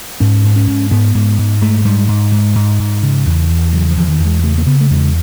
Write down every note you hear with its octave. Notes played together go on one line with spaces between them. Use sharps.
G#2 C#4
G#2
C#4
G#2
G#2 B3
G#2
G#2
G#2 A3
G#2 G3
G#2
G#2
G#2
G#2
C#3
E2
E2
C#3 F#3
F3
E2 E3
D#3
E2
G#3
C#3 A3
A#3
C#3 B3
A3
E2 G#3